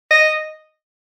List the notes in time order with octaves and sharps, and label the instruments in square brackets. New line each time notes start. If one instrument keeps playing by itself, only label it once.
[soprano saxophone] D#5